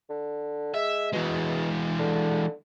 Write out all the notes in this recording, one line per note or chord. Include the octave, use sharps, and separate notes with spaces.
D3
G#3 E5
B2 E3 G#3
D3